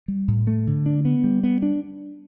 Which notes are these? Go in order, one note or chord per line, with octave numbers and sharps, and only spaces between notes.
G3
A2
A3
D3
D4
B3
G3
B3
D4